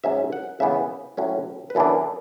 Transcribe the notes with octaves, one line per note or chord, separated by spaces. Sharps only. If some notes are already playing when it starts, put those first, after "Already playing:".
G#2 F#3 C#4 E5
F#5
C#3 E3 B3 E5
A2 F#3 C#4
B4
F#2 E3 B3 D4 A4